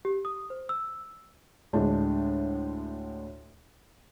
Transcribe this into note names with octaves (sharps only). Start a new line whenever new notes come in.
G4
D#6
C5
E6
D2 A2 G#3 D4